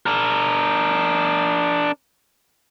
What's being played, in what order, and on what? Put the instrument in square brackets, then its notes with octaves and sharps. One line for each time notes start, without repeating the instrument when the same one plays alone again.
[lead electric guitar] D4 A#4